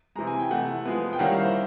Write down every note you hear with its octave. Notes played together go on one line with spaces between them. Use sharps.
C3 E3 G#3 A#5
G#5
G5
C3 E3 A3 F#5
F3 G#3 B3
G5
D#3 G3 A#3 C#4 E4 F#5
F5
C5